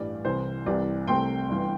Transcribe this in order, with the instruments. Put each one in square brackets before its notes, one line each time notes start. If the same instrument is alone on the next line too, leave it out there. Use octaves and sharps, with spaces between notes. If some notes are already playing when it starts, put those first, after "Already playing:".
Already playing: [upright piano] A1 G2 E3 G3 D5
C2 C3 E3 C5
C2 C3 E3 G3 D5
C2 C3 A3 C4 G5 C6
G1 G2 E3